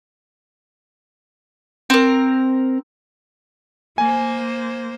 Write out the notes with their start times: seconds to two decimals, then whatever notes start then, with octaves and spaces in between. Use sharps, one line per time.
1.90 C4 A#4
3.98 A#3 C5 G#5